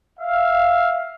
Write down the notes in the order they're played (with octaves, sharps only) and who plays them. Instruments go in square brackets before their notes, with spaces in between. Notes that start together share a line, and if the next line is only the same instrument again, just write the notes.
[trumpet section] E5 F5